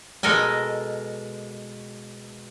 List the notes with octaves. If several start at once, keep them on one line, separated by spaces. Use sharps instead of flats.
B2 G#3 A4 A#4 D#5 G#5